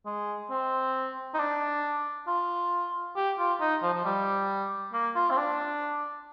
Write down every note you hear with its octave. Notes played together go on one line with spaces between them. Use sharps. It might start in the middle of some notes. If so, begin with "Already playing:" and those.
G#3
C4
D#4
D4
F4
G4
F4
D#4
F3
F3
G3
A#3
F4
C4
D4